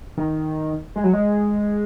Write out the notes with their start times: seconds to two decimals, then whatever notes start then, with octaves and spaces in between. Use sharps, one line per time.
0.17 D#3
0.96 G#3
1.04 F#3
1.13 G#3